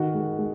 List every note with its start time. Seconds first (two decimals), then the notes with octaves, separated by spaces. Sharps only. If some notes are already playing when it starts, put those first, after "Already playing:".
Already playing: D#3 F#4 F#5
0.14 G#3
0.39 G#3